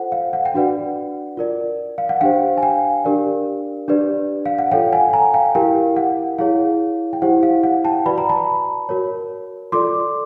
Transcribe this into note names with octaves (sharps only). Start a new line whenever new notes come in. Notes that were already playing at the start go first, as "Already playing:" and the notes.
Already playing: F4 A4 C5 F#5
F5
F#5
G5
D4 F#4 B4 D5 F#5
F4 A#4 D5
F5
F#5
D4 G4 C5 F5 G5
G#5
F5 G5
D4 G4 A#4 D5
D4 G4 B4 D5
F5
F#5
F4 A4 C#5 F5 G5
F#5 G#5
G#5 A#5
F5 G5
E4 G4 A#4 F5 G5
F#5
E4 G#4 C#5 F5
G5
E4 G4 C5 F#5
F5
F#5
G5 A5
F#4 B4 D5 B5
A#5
A5 B5
F#4 A#4 C#5
F4 A4 D5 C6 D6